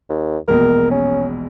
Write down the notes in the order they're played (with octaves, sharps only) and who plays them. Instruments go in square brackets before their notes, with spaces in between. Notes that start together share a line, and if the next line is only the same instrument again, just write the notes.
[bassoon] D#2
[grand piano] E1 A#1 B2 [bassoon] A#4
[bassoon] C#4